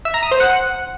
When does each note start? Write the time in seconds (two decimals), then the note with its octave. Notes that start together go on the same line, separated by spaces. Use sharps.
0.05 E5
0.14 A#5
0.23 D#6
0.31 C5
0.40 F#5